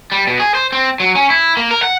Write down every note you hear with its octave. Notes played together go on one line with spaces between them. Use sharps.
G3
B2
G#4
C5
C4
F#3
C#4
E4
A#3
A#4
F#5